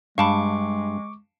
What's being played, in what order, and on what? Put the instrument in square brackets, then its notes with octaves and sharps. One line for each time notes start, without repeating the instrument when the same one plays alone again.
[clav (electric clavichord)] G2 [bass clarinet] G#3 [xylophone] F5 A5 B5 [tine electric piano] C#6 D6